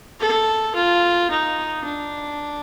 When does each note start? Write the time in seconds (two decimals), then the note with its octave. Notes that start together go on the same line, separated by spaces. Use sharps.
0.21 A4
0.75 F4
1.30 D#4
1.85 D4